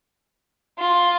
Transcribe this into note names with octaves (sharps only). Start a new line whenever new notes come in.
F4